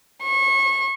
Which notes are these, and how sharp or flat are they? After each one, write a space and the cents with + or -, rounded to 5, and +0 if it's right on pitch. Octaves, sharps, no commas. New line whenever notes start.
C#6 -30